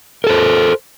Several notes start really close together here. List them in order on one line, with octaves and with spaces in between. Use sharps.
A#4 A4 C5